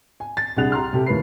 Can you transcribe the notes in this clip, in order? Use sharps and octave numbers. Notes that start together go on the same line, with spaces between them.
G#5
A6
C2 D4 G#4 F#5 F#6 F7
G4 A#5 C6 F6
C3 G4 A4
D#2 A2 A#4 B4 B5 C7